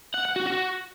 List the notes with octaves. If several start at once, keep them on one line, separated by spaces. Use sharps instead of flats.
F#5
F#5
F#4
F#4